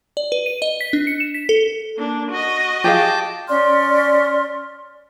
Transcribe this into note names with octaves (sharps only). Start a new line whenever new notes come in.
D5
B4
D#7
D#5
B6
D4
C#7
E7
B6
A4
A#3 D4
F#4 D#5
G4 G#4 F5 G5 A5 D6
C#4 D5 C6 F6